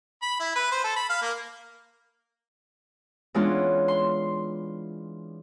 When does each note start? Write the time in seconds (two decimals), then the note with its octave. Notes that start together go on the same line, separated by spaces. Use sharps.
0.22 B5
0.40 E4
0.56 B4
0.71 C5
0.84 A4
0.96 B5
1.10 F5
1.22 A#3
3.34 E3 G#3 B3 C#4 D4 F4
3.88 C6